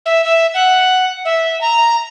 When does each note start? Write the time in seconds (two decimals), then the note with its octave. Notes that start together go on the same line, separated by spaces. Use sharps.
0.06 E5
0.25 E5
0.54 F#5
1.25 E5
1.61 A#5